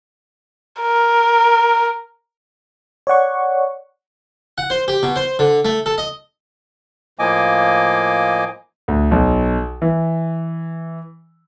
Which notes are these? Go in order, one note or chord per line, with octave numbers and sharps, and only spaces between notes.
A#4
C#5 D5 F#5 C#6
F#5
C5
G4
B2
C5
D3
A3
A4
D#5
A2 F3 A#3 D#5 G#5 D6
D2
B1
E3